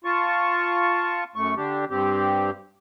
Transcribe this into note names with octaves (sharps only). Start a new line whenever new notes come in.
F4 A5 C#6
F#2 A3 C#6
D3 D4 G4
G2 C4 G4